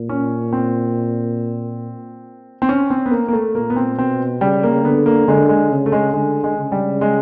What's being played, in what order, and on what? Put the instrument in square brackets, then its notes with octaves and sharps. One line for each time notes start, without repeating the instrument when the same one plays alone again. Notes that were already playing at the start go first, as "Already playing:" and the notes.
Already playing: [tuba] A#2
[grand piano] C#4
C4
C4
C#4
C4
B3
A#3
A#3
A3
[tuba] A#2 [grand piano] A#3
[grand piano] B3
C4
[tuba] B2 [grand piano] C4
[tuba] C#3 [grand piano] G3
[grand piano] A#3
[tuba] D3 [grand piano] B3
[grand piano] A#3
[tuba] D3 [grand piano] G#3
[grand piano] G#3
[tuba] C#3
[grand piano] A3
G#3
[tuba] D3 [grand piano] G#3
[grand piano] G#3
[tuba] C#3
[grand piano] G3
G#3